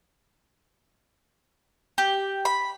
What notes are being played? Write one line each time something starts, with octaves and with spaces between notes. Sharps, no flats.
G4
B5